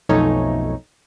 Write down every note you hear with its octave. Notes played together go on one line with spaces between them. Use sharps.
B1 F2 A3 C#4 D#4 C#5